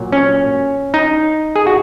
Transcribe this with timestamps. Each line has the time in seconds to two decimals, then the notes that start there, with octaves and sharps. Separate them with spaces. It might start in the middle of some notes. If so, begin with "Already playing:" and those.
Already playing: A#2 F#3
0.12 C#4
0.94 D#4
1.56 G#4
1.67 F#4